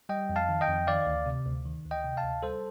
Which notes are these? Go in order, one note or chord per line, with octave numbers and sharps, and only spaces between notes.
G3 D#5 G5
F2
F5 A5
D#3
D#5 G5
F2
D#3 D5 F5
D2
C3
D2
D#3
D2
D#5 G5
C3
F5 A5
D2
G3 A4 C5